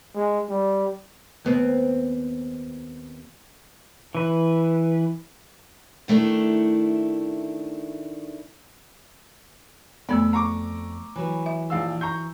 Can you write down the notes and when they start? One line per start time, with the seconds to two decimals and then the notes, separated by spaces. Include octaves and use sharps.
0.15 G#3
0.49 G3
1.45 D#2 B3 C4
4.15 E3 B4
6.08 D#3 A3 D4 E4
10.09 F2 A3 B3 A4 D5 B5 E6
10.33 A#5 C#6 D6
11.16 E3 F#3 B4
11.46 E5
11.70 A#1 F5 E6
12.01 A#5 C#6 G6